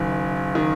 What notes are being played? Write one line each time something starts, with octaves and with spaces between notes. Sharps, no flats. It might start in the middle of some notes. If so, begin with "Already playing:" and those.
Already playing: F#1 F#2 D#3
D#3